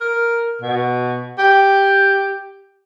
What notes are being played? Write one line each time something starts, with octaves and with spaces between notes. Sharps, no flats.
A#4
B2
G4